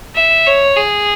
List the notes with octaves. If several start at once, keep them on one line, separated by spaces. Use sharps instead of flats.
E5
C#5
G#4